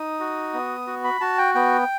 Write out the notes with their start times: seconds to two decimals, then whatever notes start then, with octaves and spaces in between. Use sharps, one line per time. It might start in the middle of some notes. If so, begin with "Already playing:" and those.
Already playing: D#4 D#6
0.20 F#4
0.54 B3
0.87 F#4
1.04 B5
1.21 F#4 A5
1.38 G5
1.55 B3 G5